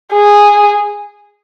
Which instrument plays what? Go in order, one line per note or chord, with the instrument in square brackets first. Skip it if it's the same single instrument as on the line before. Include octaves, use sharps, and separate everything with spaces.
[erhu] G#4